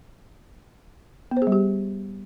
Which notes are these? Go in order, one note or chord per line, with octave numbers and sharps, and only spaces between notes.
B3
C5
G#4
G3
G4